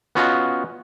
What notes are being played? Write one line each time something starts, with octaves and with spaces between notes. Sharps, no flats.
B3 C#4 F4 F#4 D#5